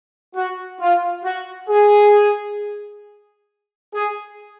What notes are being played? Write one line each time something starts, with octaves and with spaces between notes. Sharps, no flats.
F#4
F4
F#4
G#4
G#4